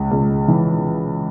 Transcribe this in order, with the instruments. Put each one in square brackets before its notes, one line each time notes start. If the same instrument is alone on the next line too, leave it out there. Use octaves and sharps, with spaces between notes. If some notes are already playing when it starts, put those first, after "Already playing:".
Already playing: [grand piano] C#2
C#2
E3